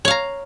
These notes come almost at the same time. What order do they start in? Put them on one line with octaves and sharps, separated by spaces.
C#5 F5 A#5